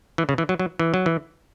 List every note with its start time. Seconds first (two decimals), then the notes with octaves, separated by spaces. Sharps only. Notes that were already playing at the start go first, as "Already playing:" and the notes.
0.18 E3
0.29 C#3
0.38 E3
0.49 F#3
0.59 F#3
0.79 E3
0.94 F#3
1.06 E3